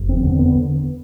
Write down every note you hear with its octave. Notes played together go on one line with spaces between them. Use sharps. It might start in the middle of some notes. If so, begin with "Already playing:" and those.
Already playing: F#1
E2 C4
D3
B3